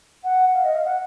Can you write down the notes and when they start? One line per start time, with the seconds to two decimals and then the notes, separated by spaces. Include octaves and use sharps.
0.23 F#5
0.53 F5
0.63 D#5
0.74 F5
0.84 F#5